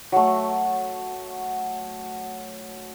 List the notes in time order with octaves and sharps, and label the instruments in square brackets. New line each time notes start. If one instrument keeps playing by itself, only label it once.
[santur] F#3 A3